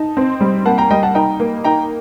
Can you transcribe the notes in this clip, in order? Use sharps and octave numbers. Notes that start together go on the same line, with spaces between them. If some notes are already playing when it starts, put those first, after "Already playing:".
Already playing: D#4 A5
C4
G3
A#3 F#5 A5
G5 A#5
G3 D#5 G5
F#5 A5
D#4 G5 A#5
A#3
D#4 G5 A#5